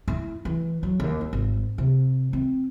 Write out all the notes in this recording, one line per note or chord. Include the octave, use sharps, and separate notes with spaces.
E4
E3
F#3
D#2
D#3
G#1
C3
C4